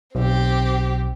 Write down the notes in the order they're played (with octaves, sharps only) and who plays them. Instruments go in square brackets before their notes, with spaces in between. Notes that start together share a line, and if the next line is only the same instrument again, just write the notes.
[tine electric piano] B1 [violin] C4 G4